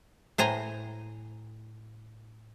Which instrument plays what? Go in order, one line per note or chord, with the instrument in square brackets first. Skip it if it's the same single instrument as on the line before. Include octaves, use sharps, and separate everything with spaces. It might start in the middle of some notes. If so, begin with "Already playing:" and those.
[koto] A2 C5 G#5 A#5